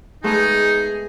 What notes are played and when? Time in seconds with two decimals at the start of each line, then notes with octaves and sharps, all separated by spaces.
0.24 G#3 A3 B3 D#4 G#4